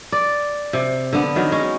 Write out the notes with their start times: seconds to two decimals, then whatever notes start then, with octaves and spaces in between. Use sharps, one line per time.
0.12 D5
0.73 C3
1.13 D3 B3
1.36 D#3 F#3
1.52 G#3 C#4